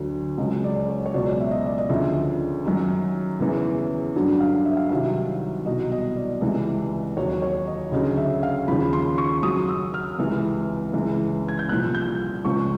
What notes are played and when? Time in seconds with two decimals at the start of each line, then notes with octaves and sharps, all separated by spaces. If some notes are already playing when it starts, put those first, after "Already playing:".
Already playing: D2 D3 F#3
0.38 C#2 C#3 F#3 D#5
0.64 D5
0.89 C#5
1.06 C#5
1.14 C#2 B2 F#3 D5
1.40 E5
1.51 D#5
1.66 D5
1.78 D#5
1.89 D2 C#3 F3 E5
2.65 F#2 D#3 F#3
3.40 E2 C#3 E3
4.16 G2 D3 F#3
4.40 F5
4.65 E5
4.77 F5
4.89 C2 C3 D#3 F#3 E5
5.66 C2 B2 F#3 D#5
5.92 D#5
6.16 D5
6.41 C#2 C3 E3
7.17 D#2 D#3 F#3 C#5
7.42 C#5
7.67 D#5
7.92 D2 C#3 F#3 D#5
8.17 E5
8.43 F5
8.68 D#2 C#3 F3 B5
8.93 C6
9.18 C#6
9.43 F#2 C#3 F#3 D#6
9.69 E6
9.94 F6
10.18 C#2 C3 E3
10.93 C#2 C#3 E3
11.48 G#6
11.59 G6
11.69 C2 A#2 F3 F#6
11.95 G6
12.45 C#2 C#3 F3 C#6